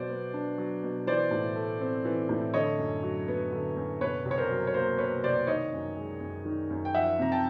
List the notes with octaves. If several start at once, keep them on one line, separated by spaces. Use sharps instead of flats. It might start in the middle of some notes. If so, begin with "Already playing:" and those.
Already playing: B2 F#3 C5 D5
B3
D4
F#3
B2
E3 C5 D5
A2
A3
C4
E3
A2
D3 C#5 D#5
F#2
F#3
B3
D3
F#2
B2 B4 C#5
C2
C#5
A#4 C5
F#3
C#5
A#3 A#4 C5
B2 B4 C#5
C2 C5 D5
D#3 C#5 D#5
F#2
G#3
F#2
D#3
F#2
G5
F3 E5 F#5
C3 A#5
G5 A5